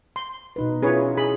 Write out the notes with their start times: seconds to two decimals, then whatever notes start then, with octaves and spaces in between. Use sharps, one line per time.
0.16 C6
0.56 B2 D#4 B4
0.83 C#4 E4 F4 G#4 B4 C#5
1.17 G#4 B5